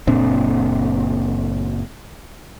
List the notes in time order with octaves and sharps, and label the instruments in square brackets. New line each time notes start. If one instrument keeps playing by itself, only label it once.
[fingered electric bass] F#1 A#2 C4 D4